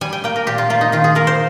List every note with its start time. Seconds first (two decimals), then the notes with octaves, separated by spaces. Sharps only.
0.01 G3 G#5
0.13 G5
0.24 A#3 G5
0.36 A#4
0.47 A#2 G4
0.58 F4
0.70 A#3 F4
0.81 D#4
0.92 D#3 F4
1.04 G#4
1.15 A#3 A#4
1.27 C5